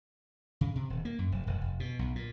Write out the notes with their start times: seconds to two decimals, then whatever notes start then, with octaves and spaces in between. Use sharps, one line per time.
0.61 C#3
0.76 C3
0.90 D#1
1.05 A#3
1.19 F#2
1.32 F1
1.47 E1
1.61 F1
1.80 B2
1.99 B1
2.15 A#2